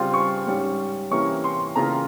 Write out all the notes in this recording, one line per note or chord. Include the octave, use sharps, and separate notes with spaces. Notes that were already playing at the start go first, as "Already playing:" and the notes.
Already playing: C#3 G3 C4 F4
C#6
G#2 G3 C#4
C3 E3 A#3 C#4 E4 C#6
C6
C#3 E3 A#3 F4 A#5